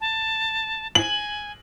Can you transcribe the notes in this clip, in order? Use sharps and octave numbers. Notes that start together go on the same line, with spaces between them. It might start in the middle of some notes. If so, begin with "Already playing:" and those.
A5
G#5 F#7